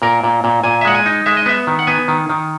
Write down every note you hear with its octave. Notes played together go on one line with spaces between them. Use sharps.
A#2 A#4
A#2
A#2
A#2 G#5
E5
G#3 F#5
G#5
D#4
G#3 E5
D#5
B3 E5
D#3
F#5
B3 G#5
D#3
D#3